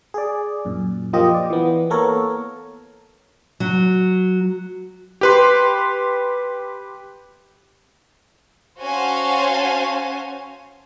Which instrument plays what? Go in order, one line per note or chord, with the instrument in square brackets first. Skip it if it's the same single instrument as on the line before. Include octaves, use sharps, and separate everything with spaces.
[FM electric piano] G#4 D5
F#2 A#2
F3 A#3 F4 G4 D#5
D5
E3 B3
A#3 B3 A4 A#4 C#5
[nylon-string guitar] F#3
[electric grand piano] G4 B4 C6
[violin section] C#4 F#4 C5 F5 G#5 A5